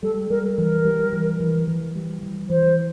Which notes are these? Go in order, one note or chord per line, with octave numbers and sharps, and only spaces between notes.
G3 A4
G3 A#4
E3 A#4
G3
E3
E3
E3
G3
E3
E3 C5